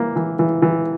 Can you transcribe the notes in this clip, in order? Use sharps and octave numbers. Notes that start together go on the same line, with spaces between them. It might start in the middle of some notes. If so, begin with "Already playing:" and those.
Already playing: E3 A#3
E3
E3
E3